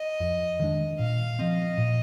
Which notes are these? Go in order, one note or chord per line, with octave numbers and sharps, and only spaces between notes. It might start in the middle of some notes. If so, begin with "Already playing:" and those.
Already playing: D#5
F2
D#3 G#3 D4
A#2 F5
F3 C4 D#5
A#2